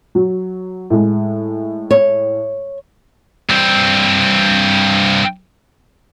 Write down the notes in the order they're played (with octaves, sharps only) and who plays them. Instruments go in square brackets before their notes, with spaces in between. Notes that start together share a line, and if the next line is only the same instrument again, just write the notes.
[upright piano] F#3
A2 G#3
[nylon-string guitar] C#5
[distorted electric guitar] G2 C4